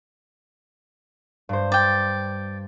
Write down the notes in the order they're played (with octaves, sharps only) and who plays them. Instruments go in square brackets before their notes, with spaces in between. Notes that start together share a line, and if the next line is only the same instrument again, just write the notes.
[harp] G2 C5
[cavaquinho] D5 G5